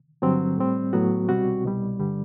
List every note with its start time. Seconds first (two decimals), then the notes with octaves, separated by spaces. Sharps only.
0.22 G2 D3 F#3 C4
0.58 A2 G3 C4
0.93 A2 F#3 B3 F#4
1.29 C2 B2 G3 C4 F#4
1.64 C2 B2 G3
1.99 G2 D3 G3